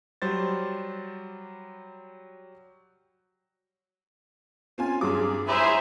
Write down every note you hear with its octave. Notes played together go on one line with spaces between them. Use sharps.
F#3 G3 C5 A6
C4 C#4 F4 G#5
G2 F#3 G#4 D6
E4 G#4 C5 C#5 E5 A#5